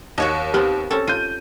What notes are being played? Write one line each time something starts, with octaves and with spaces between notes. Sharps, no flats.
D#2 F#4 C#5 D#5
B3 C4 G4
C4 C#4 A4
F4 G6 D#7